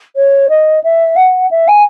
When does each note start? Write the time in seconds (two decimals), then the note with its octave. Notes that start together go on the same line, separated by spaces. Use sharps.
0.16 C#5
0.49 D#5
0.84 E5
1.16 F#5
1.51 E5
1.68 G#5